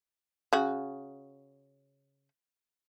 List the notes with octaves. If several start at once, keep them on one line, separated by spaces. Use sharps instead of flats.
C#3 F#4